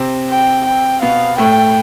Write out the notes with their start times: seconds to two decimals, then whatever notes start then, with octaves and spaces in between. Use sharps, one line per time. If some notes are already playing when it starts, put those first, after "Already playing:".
Already playing: C3 C4
0.30 G5
0.66 G5
1.02 B2 B3 F5
1.38 A2 A3 G5